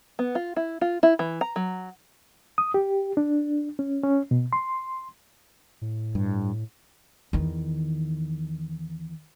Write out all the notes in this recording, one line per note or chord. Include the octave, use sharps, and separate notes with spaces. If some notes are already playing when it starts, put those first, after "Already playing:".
B3
F4
E4
F4
E4
E3
A#5
F#3
D#6
G4
D4
C#4
C#4
B2
C6
A2
G2
E2 D#3